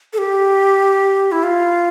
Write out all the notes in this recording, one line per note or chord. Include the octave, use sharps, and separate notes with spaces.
A4
G4
E4
F4